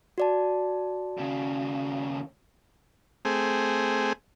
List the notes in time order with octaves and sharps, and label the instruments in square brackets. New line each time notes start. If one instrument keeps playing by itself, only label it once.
[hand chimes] F#4 D5 A5
[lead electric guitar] D#2 C#3
[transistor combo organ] A3 C4 G#4